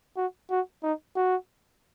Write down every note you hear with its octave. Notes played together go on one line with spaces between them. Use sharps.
F#4
F#4
D#4
F#4